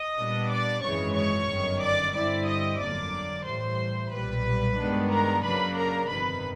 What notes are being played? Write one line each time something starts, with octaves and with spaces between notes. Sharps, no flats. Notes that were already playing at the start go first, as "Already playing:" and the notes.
Already playing: D#5 D#6
A#2 G3 B3 D4
D5 D6
G#1 F#2 C#3 E3 G#3 C#5 C#6
C#5 C#6
G1 F#2 D#3
D5 D6
G2 D3 G3 C4 E4 D5 D6
D#5 D#6
G1 F2 D3 F#3 A#3 D5 D6
A2 E3 G3 C5 C6
B1 A#2 G3 B4 B5
G2 D#3 G#3 B3 D4
A#4 A#5
F#2 C#3 F#3 A#3 D4 B4 B5
A#4 A#5
G1 F2 C3 D#3 B4 B5